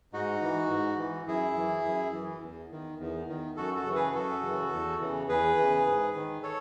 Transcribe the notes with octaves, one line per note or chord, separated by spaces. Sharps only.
G#2 D#4 F#4
E3
G#2
E3
F#2 E4 G#4
E3
F#2
E3
E2
D#3
E2
D#3
F#2 F#4 A4
F#4 A4
C#3 E3
G#4 B4
F#2 F#4 A4
C#3 E3
E2
C#3 E3
E2 G#4 B4
C#3 E3
G#2
D#3
A4 C#5